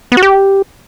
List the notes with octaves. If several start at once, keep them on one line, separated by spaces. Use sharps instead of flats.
B3
F#4
G4